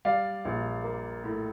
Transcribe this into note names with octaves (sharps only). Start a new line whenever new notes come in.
G3 D5 F5
A#1
A#3
A2